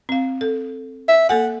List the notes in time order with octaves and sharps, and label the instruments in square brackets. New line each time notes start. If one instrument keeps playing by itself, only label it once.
[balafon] C4 F5
A4
[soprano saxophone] E5
[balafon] A#3 A4 G#5 [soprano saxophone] F#5